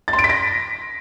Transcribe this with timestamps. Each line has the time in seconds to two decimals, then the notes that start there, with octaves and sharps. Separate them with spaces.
0.08 A6
0.13 C6
0.19 D7
0.24 B6
0.29 A#6